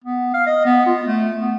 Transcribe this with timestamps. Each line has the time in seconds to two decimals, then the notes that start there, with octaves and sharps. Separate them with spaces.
0.04 B3
0.34 F5
0.46 D#5
0.65 B3
0.86 F4
1.06 A3
1.42 B3